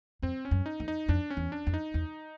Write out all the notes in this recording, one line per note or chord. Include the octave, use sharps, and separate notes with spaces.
F2 C4
C#4
F#2
D#4
F2
D#4
F2 D4
C#4
E2
D4
F2
D#4
E2